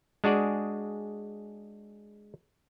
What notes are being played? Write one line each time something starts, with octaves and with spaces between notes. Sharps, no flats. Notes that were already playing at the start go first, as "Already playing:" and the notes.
G#3 D4 F#4 G#4 D5